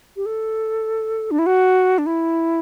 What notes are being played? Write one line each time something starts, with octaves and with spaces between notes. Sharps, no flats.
G4
A4
D4
E4
F#4
D4
E4